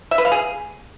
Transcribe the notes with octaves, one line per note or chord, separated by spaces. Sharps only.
E5
B4
F5
G#4